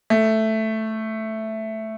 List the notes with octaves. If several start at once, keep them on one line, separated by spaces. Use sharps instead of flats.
A3